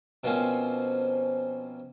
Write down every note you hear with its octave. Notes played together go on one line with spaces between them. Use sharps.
B2 F3 A#3 C4 C#4